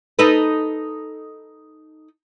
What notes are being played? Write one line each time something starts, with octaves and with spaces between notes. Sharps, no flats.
D#4 A4 B4